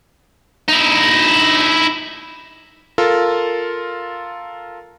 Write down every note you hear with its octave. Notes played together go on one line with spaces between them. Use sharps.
D#4 E4
F4 A4 A#4